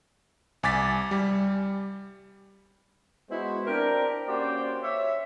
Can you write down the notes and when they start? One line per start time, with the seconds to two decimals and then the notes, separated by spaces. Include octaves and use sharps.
0.63 C2 G#5 D6 A6 B6
1.11 G3
3.30 G#3 B3 E4 F#4 C5
3.66 C4 D4 G4 A#4
4.28 A#3 C#4 F#4 G4 C5 D5
4.83 C#5 E5